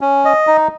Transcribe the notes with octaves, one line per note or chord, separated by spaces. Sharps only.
C#4
D#5
D#4